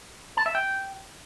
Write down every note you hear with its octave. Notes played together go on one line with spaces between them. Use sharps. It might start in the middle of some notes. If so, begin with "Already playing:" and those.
A5
E5
G5